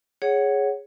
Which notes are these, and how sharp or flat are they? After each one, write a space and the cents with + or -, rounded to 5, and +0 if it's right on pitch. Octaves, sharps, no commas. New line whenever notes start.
G#4 +0 C#5 +0 F#5 +10